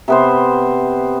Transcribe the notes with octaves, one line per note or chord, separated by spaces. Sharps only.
C3 B3 C5